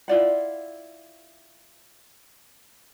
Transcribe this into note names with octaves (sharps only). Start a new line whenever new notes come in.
E4 F4 D5 F#5